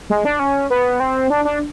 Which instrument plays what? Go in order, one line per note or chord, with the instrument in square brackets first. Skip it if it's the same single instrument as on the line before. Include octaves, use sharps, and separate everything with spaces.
[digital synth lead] G#3
D4
C#4
B3
C4
D4
D4